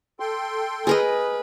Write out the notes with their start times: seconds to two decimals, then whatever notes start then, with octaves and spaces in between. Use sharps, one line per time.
0.20 A4 G5 C6
0.87 G#4 A#4 B4 D#5